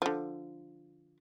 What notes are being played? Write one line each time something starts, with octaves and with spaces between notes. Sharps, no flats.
D3 F3